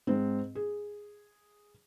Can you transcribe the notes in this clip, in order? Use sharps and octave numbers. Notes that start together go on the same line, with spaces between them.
G#2 C4
G#4